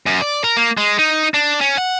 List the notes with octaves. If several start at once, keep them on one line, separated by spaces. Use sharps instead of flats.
F#2
D5
A#4
A#3
G#3
D#4
D4
C#4
F#5